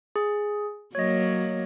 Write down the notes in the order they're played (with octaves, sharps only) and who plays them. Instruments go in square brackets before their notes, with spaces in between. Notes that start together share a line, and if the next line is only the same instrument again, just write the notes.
[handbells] G#4
[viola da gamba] F#3 A#3 [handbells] C#5 D#5